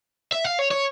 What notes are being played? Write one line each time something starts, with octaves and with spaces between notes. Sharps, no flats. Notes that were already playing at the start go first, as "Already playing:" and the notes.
E5
F5
C#5
C#5